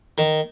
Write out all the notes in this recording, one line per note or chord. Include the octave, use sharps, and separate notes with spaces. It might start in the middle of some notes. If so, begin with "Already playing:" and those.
D#3